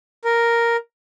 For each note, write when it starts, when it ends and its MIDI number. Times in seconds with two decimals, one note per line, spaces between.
0.25 0.76 70